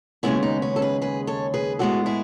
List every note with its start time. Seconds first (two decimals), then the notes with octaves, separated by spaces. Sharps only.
0.23 D#2 C#3 G#3 B3 C#4 E4
0.43 D#4
0.62 C#4
0.76 A4
0.82 G#4 B4
1.02 G#4 B4
1.27 A4 C#5
1.54 G#4 B4
1.79 A2 G#3 B3 F#4 A4
2.06 E4 G#4